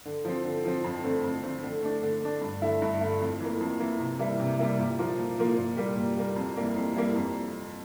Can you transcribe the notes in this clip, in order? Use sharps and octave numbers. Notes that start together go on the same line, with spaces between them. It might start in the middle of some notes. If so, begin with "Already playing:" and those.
D3
F3 C4
D3
F3 C4
F2
D3 A3 C4
F2
D3 A3 C4
D3
A3 D4
D3
A3 D4
G2
D3 A3 E4
G2
D3 A3 E4
F2
E3 A#3
F2
E3 A#3
C3
E3 G3 A#3 E4
C3
E3 G3 A#3 E4
A#2
F3 A#3 F4
A#2
F3 A#3 F4
A#2
G3 A#3
A#2
G3 A#3
F2
E3 G3 A#3
F2
E3 G3 A#3
F2